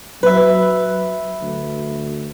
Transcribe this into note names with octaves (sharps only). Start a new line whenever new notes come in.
F#3 B4 E5
D2